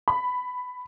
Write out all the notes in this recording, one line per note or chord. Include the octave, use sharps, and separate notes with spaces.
B5